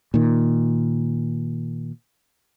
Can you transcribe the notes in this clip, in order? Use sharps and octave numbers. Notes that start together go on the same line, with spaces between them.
A#2 D#3